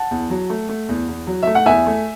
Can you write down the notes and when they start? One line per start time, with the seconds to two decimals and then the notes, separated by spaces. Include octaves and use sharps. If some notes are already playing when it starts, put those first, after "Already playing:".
Already playing: F#5 A5
0.11 E2
0.30 F#3
0.50 A3
0.69 A3
0.89 E2
1.08 E2
1.27 F#3
1.43 A3 E5
1.55 F#5
1.66 E2 E5 G#5
1.86 A3